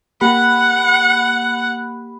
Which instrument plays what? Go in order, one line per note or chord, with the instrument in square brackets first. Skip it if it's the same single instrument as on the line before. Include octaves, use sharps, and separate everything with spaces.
[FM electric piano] A#3 G4 B5 [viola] F#5